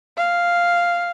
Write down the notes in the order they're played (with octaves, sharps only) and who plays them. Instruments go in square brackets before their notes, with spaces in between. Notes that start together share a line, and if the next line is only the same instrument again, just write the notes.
[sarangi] F5